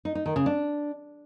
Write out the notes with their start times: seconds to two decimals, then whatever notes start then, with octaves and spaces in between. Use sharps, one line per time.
0.05 D#4
0.15 D#4
0.26 D#3
0.36 C#3
0.46 D4